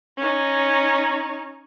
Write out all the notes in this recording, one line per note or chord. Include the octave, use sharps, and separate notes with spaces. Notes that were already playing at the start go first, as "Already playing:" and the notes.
C#4 D#4